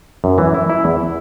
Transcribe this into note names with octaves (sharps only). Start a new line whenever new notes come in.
F#2
E3
E4
E4
E2